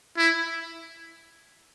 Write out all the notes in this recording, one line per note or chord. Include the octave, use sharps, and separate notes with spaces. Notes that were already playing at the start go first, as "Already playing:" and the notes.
E4